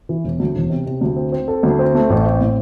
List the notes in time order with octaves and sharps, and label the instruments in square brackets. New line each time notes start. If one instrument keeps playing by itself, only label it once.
[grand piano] E3
E1
D2
E1
C3
C3
D2
C4
C4
A4
D2
C4
A3
A1
C4
A2